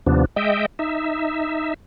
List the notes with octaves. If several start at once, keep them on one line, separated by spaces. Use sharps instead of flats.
D#2 C3 F3 B3 D4
G#3 D#5 E5 G5
D#4 E5